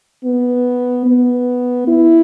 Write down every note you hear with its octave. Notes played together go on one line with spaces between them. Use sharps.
B3
B3
E4